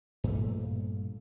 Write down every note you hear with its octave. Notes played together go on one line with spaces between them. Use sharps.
G2 A#2 A3